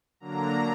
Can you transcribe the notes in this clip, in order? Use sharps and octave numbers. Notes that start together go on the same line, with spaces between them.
D3 F#3 A#3 D4 A#5